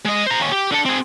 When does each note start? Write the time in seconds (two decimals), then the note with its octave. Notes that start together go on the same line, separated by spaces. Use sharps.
0.06 G#3 D#5
0.27 C5 A#5
0.40 D#2 C#4
0.52 G4
0.72 D3 A4
0.85 C4 G#4